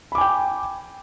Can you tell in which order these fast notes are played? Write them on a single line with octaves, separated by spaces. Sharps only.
B5 D6 G#5 G5